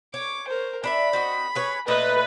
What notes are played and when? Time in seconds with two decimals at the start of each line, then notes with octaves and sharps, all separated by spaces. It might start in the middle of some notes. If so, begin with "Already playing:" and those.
0.14 C#5 D6
0.48 A#4 C5
0.84 D4 D#5 E5 B5
1.13 C4 F#4 D#5
1.55 G#4 B4 C#5
1.88 A#2 A3 D#4 B4 D#5